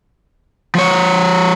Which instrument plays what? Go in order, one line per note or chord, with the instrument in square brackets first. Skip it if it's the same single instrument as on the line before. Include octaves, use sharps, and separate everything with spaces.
[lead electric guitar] F3 C#5